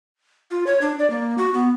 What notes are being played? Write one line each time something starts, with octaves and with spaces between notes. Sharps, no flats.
F4
C#5
D4
D5
A#3
F#4
B3